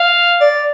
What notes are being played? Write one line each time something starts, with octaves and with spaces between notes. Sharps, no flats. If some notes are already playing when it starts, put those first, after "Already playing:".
Already playing: F5
D5